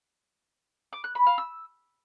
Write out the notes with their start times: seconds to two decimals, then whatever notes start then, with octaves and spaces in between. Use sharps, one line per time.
0.93 D6
1.04 F#6
1.15 B5
1.27 F5
1.38 E6